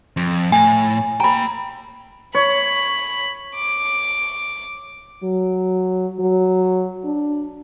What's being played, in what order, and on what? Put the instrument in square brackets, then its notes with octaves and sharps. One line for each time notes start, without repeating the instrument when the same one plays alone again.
[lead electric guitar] F2
[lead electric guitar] A2 [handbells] G#5
[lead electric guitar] A#3 G5 [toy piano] A#5 B5
[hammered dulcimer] C#5 [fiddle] B5
[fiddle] D6
[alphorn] F#3
F#3
D4